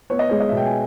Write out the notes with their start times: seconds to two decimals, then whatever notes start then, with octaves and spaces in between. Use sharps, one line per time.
0.10 B3 C#5
0.19 D#5
0.29 G#3 C#5
0.40 D#5
0.49 B2 E5
0.57 G5
0.65 G#5